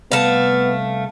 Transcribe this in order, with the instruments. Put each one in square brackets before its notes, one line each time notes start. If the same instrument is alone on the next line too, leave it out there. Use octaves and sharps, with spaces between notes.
[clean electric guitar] C2 A5 [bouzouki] A3 F5 [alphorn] B3